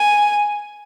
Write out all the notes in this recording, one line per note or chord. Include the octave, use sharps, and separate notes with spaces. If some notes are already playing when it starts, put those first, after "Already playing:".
Already playing: G#5